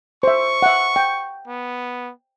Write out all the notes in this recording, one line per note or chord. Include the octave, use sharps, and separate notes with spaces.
C5 E5 C#6
E5 F#5
G5
B3